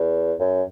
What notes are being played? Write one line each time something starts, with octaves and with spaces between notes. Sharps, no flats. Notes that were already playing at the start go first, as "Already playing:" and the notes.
Already playing: E2
F#2